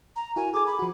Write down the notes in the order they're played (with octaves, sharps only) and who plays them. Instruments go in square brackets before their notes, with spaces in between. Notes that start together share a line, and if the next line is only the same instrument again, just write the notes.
[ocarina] A#5
[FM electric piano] E4 F#4 A#4 [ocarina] G#5
[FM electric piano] G#4 A4 G#5 [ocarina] D6
[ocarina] B5
[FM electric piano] F3 F#4